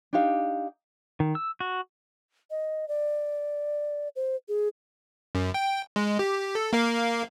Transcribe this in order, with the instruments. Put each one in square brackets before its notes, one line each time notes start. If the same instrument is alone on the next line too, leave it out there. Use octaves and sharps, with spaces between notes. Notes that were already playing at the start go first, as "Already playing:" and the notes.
[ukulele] D4 D#4 G4 F5
[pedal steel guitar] D#3
E6
F#4
[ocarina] D#5
D5
C5
G#4
[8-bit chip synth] F#2
G5
G#3
G4
A4
A#3 A#4 F5